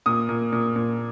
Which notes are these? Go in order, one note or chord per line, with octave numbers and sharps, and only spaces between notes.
A#2 D#6
A#2
A#2
A#2